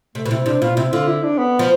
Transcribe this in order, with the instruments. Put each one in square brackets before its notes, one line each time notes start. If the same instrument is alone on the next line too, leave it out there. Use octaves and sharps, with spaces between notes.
[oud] C3 [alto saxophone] A3
[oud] B2
[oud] C3 [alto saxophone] E4
[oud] C3 [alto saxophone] D4
[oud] B2 [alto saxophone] F4
[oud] C3 [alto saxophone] E4
[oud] D3 [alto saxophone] F4
[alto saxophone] E4
D4
B3
[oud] F3